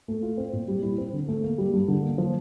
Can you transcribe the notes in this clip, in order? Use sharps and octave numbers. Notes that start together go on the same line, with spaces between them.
A3
F4
C4
A#2
G3
E4
C4
D3
A3
A#3
G3
G2
D3
A#3
F3